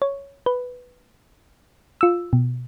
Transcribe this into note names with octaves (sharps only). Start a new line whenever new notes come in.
C#5
B4
F4 E6
B2